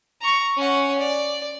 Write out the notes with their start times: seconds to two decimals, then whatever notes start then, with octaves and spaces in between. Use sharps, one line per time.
0.21 A#5 C#6
0.57 C#4 F#5
0.98 D5